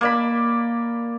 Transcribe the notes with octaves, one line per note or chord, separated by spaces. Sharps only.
A#3 D5 B5